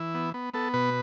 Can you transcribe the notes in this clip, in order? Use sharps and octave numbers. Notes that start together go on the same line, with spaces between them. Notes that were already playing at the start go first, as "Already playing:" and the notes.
Already playing: E3 E4
B3
B3
B3 A4
B2 B4